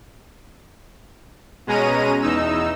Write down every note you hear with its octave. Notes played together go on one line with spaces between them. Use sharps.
B2 G#3 C#4 A#5 D#7
E2 D#4 E6